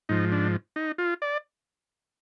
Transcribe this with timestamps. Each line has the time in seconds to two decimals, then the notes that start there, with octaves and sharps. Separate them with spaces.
0.09 G#2 F3 D#4
0.32 D4
0.76 D#4
0.98 F4
1.22 D5